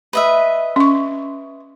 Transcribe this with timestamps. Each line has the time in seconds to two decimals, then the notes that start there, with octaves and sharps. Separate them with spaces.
0.13 B4 D#5 E5
0.76 C#4 C#6